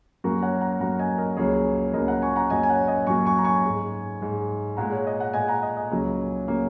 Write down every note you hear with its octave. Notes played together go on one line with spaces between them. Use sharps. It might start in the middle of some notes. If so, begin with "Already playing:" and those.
F#2 F#3 A#3 F#4 A#4
C#5 F#5
F#5 A#5
F#2 F#3 A#3 F#5 A#5
D#5 G#5
A#4 D#5
C#2 C#3 F#3 A#3 G#4 C#5
C#2 C#3 F#3 A#3 A#4 D#5
F#5 A#5
G#5 C#6
F#5 A#5
F#2 F#3 A#3 D#5 G#5
G#5
C#5 F#5
D#5 G#5
F#2 F#3 A#3 G#5 C#6
G#5 C#6
A#5
G#5 C#6
G#2 G#3
G#2 G#3
A#2 G#3 F#5 A#5
C#5
D#5
F#5
A#2 G#3 D#5 G#5
F#5 A#5
D#5 G#5
D#5 G#5
C#2 C#3 F#3 A#3
C#3 F#3 A#3